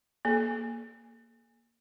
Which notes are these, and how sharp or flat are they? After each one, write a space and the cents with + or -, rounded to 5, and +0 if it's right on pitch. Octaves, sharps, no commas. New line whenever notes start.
A#3 +0 A4 -35